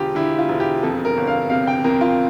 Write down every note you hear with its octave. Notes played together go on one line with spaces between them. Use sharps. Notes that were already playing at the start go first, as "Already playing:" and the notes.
Already playing: E1 D3 F4 G4
D3 E4
F4
E1
G4
F2 A4
A#4
G1
F5
C3 F5
G5
F2 A#4
F4